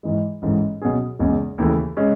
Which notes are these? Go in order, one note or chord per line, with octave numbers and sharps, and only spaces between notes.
G#2 E3 G#3
A1 G#2 E3 G#3
B2 F#3 C#4 G#4
F#1 E2 C#3 G#3 C#4
D#2 C#3 E3 A3
C#3 G#3 C#4